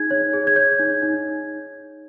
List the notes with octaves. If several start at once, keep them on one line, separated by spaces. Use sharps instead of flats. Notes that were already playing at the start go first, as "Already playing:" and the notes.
Already playing: D#4 G#4 G#6
C#5
G#4
G#6
C#5 G6
D#4
D#4